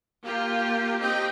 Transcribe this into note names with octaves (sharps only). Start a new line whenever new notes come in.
A#3 F4 G4
C4 D#4 G4 D#5 G5